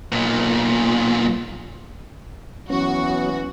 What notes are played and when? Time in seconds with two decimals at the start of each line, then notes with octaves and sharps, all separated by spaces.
0.12 B1 A#2
2.70 E3 F#3 B3 C#4 F#4